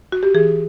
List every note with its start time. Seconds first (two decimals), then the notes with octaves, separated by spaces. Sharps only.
0.12 F#4
0.23 G4
0.34 E3 G#4